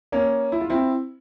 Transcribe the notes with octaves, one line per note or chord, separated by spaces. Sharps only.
A#3 C#4
E4
F4
C4 E4